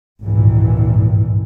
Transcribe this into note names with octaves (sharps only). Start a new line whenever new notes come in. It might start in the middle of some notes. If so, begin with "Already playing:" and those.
G#1 C#2 G2 A#2 D#3 E3